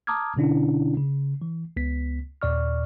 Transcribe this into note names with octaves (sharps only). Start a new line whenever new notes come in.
A5 A#5 D6 D#6 F6 G#6
B2 D3 C#4 D4 E4
C#3
E3
C#2 B3 B6
D#2 A#2 D5 C#6 F6